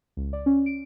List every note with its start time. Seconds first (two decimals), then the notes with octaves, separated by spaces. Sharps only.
0.17 C#2
0.33 D5
0.46 C#4
0.66 D7